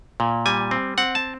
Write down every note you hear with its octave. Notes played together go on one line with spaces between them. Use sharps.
A#2
G3 G#5
C4
C4 F#5
A5